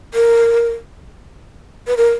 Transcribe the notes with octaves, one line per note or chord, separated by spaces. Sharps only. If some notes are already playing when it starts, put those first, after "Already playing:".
A#4
B4
A#4